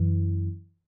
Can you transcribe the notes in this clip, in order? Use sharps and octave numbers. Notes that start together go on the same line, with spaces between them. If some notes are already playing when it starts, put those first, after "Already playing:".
Already playing: F#2 E3